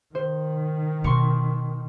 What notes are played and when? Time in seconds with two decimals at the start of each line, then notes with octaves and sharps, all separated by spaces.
0.15 D#3 C5
1.04 B2 C6 C#6 C#7